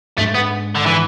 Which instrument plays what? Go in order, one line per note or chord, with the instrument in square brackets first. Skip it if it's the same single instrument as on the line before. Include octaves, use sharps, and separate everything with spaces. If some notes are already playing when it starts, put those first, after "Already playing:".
[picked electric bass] G#2 G#3 D4 [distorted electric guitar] A3
[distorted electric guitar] B3
D3
E3